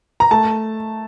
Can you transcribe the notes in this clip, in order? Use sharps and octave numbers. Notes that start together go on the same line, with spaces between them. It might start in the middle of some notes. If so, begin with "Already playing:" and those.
A#5
A3 A5